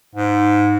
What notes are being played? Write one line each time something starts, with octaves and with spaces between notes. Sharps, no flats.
G#2